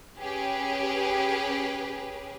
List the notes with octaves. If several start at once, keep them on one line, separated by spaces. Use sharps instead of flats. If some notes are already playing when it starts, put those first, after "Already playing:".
C#4 G4 G#4 B4